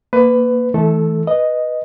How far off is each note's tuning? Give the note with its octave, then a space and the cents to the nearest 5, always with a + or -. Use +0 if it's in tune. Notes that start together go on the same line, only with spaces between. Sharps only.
A#3 +0 B4 +20
E3 -35 A3 -25 A4 +0
B4 +0 D#5 +0